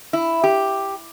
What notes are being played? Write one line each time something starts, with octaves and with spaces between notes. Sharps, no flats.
E4
G4